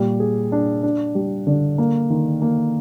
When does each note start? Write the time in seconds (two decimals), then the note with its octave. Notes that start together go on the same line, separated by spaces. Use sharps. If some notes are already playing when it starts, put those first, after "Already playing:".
Already playing: A#2 G3
0.20 G#4
0.52 D4
0.83 D4
1.15 G3
1.47 D3
1.78 A#3
2.10 D#3
2.42 A#3